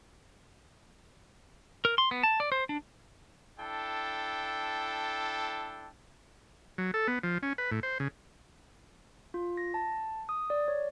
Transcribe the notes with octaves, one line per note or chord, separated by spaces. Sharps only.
A#4
C6
B3
A5
D5
C5
D4
D4 E4 A4 G5 A5
F#3
A4
B3
F3
C#4
B4
A2
C5
C#3
F4
A#6
A5
D#6
D5
C#5